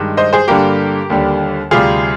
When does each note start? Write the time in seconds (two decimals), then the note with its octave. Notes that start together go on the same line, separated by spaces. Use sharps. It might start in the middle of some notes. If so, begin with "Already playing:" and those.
Already playing: G2 D#3 G#3
0.17 C5 D#5
0.33 G#4 C5
0.48 G2 D3 G3 A#3 G4 A#4
1.10 D#2 D3 G3
1.71 D2 C3 G3 F4 G#4